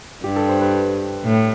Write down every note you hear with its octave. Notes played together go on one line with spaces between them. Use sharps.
G2 G4
A4
C5
B4
A2